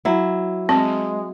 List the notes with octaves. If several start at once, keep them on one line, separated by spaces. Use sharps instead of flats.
F#3 E4
G#3 C4